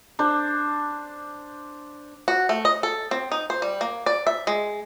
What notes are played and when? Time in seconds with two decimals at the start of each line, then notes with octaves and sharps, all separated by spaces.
0.19 D4 C5
2.28 F#4
2.49 A3
2.65 D#5
2.83 A4
3.11 C4
3.32 D#4
3.50 C5
3.62 G3
3.81 A#3
4.06 D5
4.27 E5
4.47 G#3